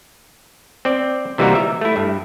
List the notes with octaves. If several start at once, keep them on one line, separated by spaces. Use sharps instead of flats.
C4 D5
C3 E3 G3 A#3 D#4 F#4
E5
A3 E4
G2